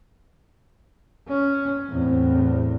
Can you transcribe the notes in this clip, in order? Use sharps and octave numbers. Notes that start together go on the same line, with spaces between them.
C#4
E2 A2 C4